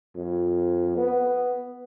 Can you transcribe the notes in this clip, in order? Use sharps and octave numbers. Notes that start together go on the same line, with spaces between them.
F2
B3